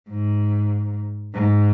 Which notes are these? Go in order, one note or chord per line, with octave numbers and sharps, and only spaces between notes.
G#2
G#2